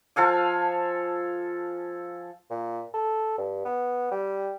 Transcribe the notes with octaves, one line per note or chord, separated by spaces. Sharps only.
F3 A4 F5 G#5
A#2
A4
G2
B3
G3